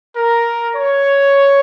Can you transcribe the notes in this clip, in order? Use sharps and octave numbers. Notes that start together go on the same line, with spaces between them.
A#4
C#5